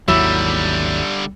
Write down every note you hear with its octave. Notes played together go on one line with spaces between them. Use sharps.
G#1 D#2 D3 F#3 G3 E4